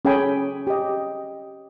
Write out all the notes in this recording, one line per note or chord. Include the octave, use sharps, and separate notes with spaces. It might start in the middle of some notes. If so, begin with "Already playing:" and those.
C#4 G#4 A4 G5 G#5 B5
G4 D#5